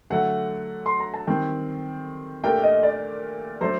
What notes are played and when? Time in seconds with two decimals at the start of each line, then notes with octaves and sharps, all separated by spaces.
0.10 D3 F#3 A3 F#5
0.86 C6
1.00 A#5
1.14 A5
1.27 D#3 G3 C4 G5
2.44 A#2 A3 D4 G4 A#4 G5
2.63 D#5
2.83 D5
3.61 F#3 A3 D4 A4 C5